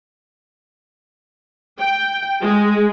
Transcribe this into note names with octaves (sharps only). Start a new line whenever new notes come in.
G5
G#3